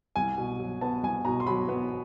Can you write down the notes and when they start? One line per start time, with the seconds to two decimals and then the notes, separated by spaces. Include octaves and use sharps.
0.16 C2 G#5
0.38 B2
0.59 F#3
0.81 B3 A5
1.03 C2 G#5
1.25 B2 A#5
1.40 C6
1.47 F#3 B5
1.69 B3